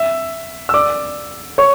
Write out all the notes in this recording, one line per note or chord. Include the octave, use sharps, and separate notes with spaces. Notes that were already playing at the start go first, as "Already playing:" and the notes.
Already playing: E5 E6
E6
D5 D6
C#5 C#6